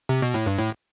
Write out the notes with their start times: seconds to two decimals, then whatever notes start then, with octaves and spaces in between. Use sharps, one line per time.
0.09 C3
0.22 B2
0.34 A2
0.47 G2
0.58 A2